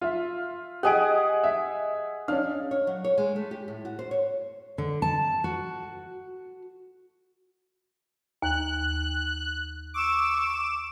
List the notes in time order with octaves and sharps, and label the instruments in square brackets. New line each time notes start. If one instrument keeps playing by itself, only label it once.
[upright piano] F4 E5
[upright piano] G4 G#5 D7 [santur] G#4 D#5 F#5
[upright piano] E5
[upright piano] C#4 D4 [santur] F5
[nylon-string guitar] C#5
F#3
C#5
G#3
A3
G4
A2
F#4
C5
C#5
[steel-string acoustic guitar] D3
A5
F#4
[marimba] D#2 [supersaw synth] F#6
[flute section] C#6 E6 [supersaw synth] D6 E7